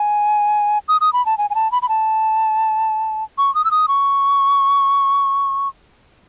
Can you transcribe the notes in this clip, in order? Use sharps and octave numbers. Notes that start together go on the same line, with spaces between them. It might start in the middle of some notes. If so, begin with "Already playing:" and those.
Already playing: G#5
D#6
D#6
B5
A5
G#5
G#5
A5
B5
B5
A5
C#6
D#6
E6
D#6
C#6